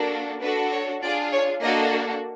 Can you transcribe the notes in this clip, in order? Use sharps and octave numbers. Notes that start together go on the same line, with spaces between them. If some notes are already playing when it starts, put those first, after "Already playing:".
Already playing: A#3 D4 F#4 A4
D4 F#4 A4 B4
C#5
D4 F4 G#4 D5
C#5
A#3 D4 F#4 A4 D#5